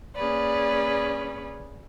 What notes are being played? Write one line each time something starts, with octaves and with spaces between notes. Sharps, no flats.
A#3 C#4 G#4 B4 D5